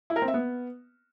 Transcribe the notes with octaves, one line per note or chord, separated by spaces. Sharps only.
E4
A#4
C4
E5
B3